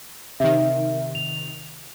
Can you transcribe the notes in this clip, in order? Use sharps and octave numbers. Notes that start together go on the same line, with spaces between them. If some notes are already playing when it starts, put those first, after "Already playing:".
C3 D#3 E5
F7